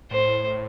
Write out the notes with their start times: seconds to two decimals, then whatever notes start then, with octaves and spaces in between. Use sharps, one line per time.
0.11 A2 C5
0.50 A2